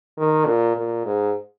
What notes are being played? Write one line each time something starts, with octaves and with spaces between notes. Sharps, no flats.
D#3
A#2
A#2
G#2